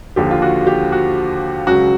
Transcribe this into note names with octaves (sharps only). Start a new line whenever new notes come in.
D#2 D3 F3 G4
F4
F#4
G4
F#4
C#2 C#3 F#3 F#4